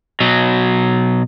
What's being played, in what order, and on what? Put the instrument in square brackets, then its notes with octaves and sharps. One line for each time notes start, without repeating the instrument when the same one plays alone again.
[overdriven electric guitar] B2 F#3